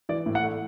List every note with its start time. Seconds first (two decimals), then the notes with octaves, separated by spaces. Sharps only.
0.09 E3 D5
0.26 A2
0.35 F#5
0.43 A3